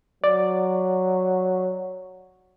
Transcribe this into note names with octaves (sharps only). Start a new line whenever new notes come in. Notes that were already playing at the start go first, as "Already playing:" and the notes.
F#3 D5